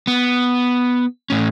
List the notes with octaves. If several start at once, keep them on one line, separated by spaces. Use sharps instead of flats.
B3
A2 C#4